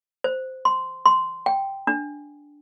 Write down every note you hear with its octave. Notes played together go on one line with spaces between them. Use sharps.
C5
C6
C6
G5
D4